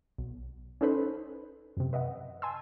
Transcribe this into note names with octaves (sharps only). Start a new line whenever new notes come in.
B1
C#4 D#4 A4 B4 C5
F#2 C3
B4 D#5 E5 F#5
G#5 A5 C6 E6